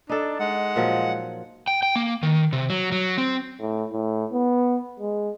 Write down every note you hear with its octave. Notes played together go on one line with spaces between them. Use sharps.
D4 D#4 A4
G#3 F#5
A#2 F3 F#3
G5
G5
A#3
D#3
C3
F#3
F#3
C4
A2
A2
B3
G#3